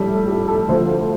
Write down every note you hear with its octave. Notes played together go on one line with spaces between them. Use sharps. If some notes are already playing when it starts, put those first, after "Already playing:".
Already playing: A#1 A2 G3 A4
G4
A4
D2 D3 F3 A3 C5